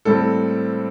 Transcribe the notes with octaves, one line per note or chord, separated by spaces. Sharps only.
A2 G3 C4 A4